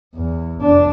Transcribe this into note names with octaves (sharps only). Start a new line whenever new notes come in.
E2
F1 D4